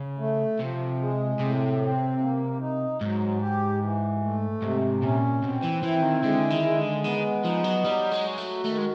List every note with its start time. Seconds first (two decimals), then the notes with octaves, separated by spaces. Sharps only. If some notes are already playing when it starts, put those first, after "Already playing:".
Already playing: C#3
0.18 A3
0.59 C3 F3
1.00 G#3
1.39 A2 C3
1.80 C4
2.20 A#3
2.60 D#4
3.01 G#2 F#3
3.41 G4
3.81 E3
4.22 A3
4.62 G#2 C3
5.02 A#2 C#4
5.42 B2 C4
5.63 E3
5.83 E3 E4
6.03 D#3
6.23 D3 G#3
6.50 D#3
6.64 G#3
6.77 D3
7.04 D#3 B3
7.44 F3 D#4
7.64 F#3
7.84 F#3 G3
8.12 G#3
8.24 F#4
8.38 A3
8.65 D#3 A3
8.78 G#3